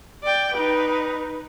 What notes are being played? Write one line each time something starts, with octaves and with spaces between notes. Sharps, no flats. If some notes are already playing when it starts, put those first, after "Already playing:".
D5 G5
D#4 B4